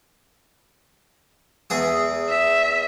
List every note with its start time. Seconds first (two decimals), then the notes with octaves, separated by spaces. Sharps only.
1.70 E2 G#4 D#6
2.28 E5